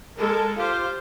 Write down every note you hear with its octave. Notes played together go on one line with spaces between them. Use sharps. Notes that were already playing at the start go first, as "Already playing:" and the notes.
G#3 A4 A#4
F4 G4 C5 F5